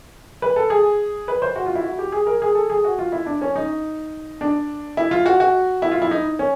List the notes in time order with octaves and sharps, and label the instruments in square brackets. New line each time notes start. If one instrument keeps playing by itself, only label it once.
[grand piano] B4
A4
G#4
B4
C5
F#4
F4
E4
F#4
G4
G#4
A#4
G#4
A4
G#4
F#4
F4
E4
D4
C#4
D#4
D4
E4
F4
F#4
F#4
E4
F4
E4
D#4
C#4